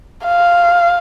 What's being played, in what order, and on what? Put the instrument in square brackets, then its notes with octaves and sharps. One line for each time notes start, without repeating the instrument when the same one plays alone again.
[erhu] F5